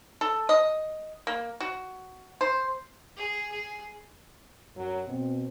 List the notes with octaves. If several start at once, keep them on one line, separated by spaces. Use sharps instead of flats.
A4
D#5
A#3
F#4
C5
G#4
G#4
F#2 F#3
B2 C4